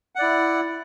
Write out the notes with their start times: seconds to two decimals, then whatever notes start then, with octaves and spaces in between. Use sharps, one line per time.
0.15 F#5
0.19 D5
0.22 E4